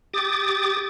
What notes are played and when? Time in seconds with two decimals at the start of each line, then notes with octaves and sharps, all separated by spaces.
0.13 G4 D6 D#6 A6